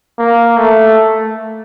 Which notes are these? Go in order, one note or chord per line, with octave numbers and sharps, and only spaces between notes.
A#3
A3